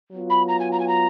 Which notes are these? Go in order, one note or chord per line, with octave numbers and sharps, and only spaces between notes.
F#3 B3 F4
B5
A#5
G#5
A#5
G#5
A#5